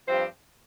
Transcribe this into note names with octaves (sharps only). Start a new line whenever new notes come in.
G2 F3 C4 G4 C5